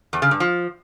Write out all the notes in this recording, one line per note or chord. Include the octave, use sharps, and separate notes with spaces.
E2
C#3
G2
F3